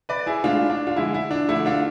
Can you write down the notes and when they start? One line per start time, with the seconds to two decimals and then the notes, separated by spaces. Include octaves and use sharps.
0.09 B4 D5
0.26 E4 G#4
0.44 A2 G#3 D4 F4
0.70 D4
0.87 F4
0.96 D3 F3 G#3 E4
1.14 E4
1.31 D4
1.49 D3 F3 A3 E4
1.66 D4 F4